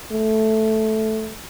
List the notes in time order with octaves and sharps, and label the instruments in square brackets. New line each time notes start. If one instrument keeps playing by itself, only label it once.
[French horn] A3